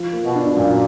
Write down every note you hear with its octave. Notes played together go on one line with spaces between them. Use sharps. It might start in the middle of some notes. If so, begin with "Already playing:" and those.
Already playing: F3
A#3
B2
D4
F#2 A#2